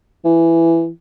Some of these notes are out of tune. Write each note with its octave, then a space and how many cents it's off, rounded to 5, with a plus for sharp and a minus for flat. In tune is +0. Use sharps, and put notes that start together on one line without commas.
E3 +10